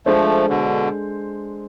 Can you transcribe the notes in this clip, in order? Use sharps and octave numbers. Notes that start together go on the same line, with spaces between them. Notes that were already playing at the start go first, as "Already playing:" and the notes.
F3 G#3 A3 D4 A4 C5
B2 D3